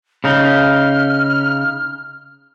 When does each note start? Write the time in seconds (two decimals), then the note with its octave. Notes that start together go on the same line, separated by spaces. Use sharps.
0.24 C#3 D#4 F6